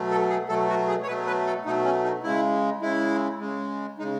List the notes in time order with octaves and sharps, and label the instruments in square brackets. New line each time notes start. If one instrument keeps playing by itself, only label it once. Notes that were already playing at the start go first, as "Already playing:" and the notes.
Already playing: [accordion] B2 F#3 A3
A4
G#4
B2 F#3 A3 A4
F#4
G#4
C#5
B2 F#3 A3 B4
B4
A4
B2 F#3 A3 D#4
C#4
D#4
C#3 G#3 E4
C#3 G#3 E4
C#3 G#3
G#3 D#4
C#3